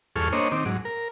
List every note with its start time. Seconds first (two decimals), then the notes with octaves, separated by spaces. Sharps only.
0.16 E2 G2 G#4 A4 C#6 F6
0.32 A#3 D4 C5 C#5 D#5
0.52 D#3 C4 D6
0.65 G#2 F#3
0.85 A#4